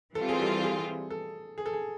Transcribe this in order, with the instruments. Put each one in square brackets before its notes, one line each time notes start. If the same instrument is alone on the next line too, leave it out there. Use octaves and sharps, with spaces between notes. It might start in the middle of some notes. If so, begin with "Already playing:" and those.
[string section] E3 G3 C4 F4 [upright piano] A4
[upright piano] G#4
A4
G#4
A4
G#4
A4
G#4